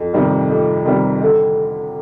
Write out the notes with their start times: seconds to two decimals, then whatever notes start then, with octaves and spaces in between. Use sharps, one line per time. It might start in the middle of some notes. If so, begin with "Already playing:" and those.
Already playing: F2
0.13 C3 D#3 G3
0.50 F2
0.85 C3 D#3 G3
1.22 D3